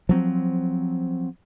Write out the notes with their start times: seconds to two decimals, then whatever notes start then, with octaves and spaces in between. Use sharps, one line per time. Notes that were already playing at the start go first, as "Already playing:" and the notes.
0.09 F3 F#3 C4